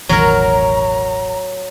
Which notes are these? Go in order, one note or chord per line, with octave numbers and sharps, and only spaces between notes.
E1 A1 D#3 F#3 A#4 C#5 A#5